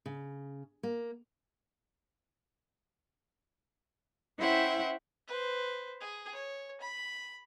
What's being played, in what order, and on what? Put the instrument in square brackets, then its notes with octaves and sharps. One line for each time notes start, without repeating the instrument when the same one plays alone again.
[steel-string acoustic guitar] C#3
A#3
[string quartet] C#4 E4 C5 E5 F#5 G5
[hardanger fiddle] B4 C5
G#4
C#5
B5